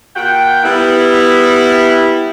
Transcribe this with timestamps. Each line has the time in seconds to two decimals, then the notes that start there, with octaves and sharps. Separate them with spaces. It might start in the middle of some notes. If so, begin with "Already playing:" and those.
0.16 A#2 F#5 G5
0.64 G3 B3 E4